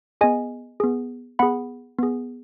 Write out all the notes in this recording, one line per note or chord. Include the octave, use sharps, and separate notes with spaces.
B3 G#4 D#5 G#5
B3 G#4
B3 G#4 F#5 B5
B3 G#4